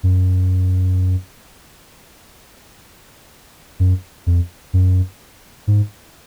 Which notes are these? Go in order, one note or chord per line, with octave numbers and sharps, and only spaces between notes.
F#2
F#2
F2
F#2
G#2